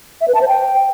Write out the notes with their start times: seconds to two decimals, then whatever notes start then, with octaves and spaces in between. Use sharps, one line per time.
0.21 E5
0.28 B4
0.35 A5
0.41 C5
0.48 G5